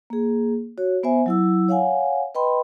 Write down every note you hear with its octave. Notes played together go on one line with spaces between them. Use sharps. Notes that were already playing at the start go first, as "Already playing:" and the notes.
A#3 G#4
F#4 C#5
B3 C5 E5 G#5
F#3 E4 E6
C#5 F5 F#5 G#5
B4 D#5 G5 B5 C6